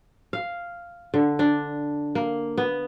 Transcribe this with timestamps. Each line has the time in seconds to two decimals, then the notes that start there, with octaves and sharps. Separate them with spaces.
0.33 F5
1.14 D3
1.39 D4
2.15 A#3
2.58 B3